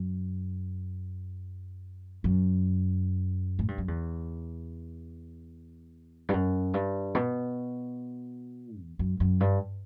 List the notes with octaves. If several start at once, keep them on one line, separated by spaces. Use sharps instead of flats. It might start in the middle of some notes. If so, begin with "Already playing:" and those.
Already playing: F#2
F#2
A2
G2
F#2
E2
G2
F#2
G2
B2
E2
F#2
F#2
G2